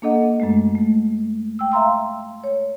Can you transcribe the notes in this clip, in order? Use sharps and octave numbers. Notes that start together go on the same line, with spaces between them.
A#3 D4 A4 D#5 F#5
F#2 G#3 A3
A3
G5 E6
E5 F5 A#5 C6 E6
C#5